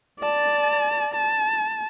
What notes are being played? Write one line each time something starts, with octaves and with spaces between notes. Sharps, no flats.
D5 A5
A5